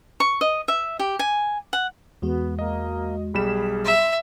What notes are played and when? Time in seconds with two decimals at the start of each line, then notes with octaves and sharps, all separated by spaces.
0.20 C#6
0.41 D#5
0.68 E5
0.99 G4
1.19 G#5
1.73 F#5
2.22 E2 G#3 B3 F#4
2.59 A#3 D#5
3.34 B1 G3 G#4 B5 B6 E7
3.85 E5 C6